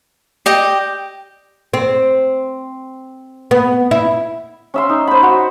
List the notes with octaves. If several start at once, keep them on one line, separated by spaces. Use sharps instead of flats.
G4 D5 D#5 G5
C4
B3
E4
C#4 E5 C6
D#4
C5 B5
F#4